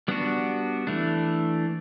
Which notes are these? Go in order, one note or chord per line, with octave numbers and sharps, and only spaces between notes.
G3 B3 D4 F#4
E3 A3 D4